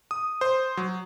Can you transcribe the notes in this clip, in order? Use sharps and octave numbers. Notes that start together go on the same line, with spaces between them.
D#6
C5
F#3